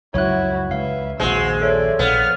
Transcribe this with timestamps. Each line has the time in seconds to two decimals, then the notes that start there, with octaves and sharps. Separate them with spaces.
0.14 C#2 F#2 F3 E4 F#4 C#5 F#6
0.71 C#2 B4 E5 F5
1.20 A#1 D#2 C3 G#3 F#4 C5 E6
1.61 A4 C#5 D5 E5
1.99 A#1 B3 F5 F6